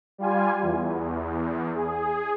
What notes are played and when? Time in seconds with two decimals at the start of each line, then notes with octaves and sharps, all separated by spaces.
0.18 G3 F4 G#5
0.62 E2
1.74 G#4